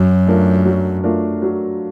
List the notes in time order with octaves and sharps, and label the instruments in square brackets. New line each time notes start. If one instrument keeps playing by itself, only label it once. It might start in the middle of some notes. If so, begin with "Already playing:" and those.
Already playing: [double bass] F#2 [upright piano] F#3
[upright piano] A3 D4 F4 A#4
F#3
A3 D4 F4 A#4
F#3